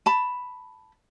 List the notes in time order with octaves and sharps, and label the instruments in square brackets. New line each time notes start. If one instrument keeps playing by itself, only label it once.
[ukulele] A5 B5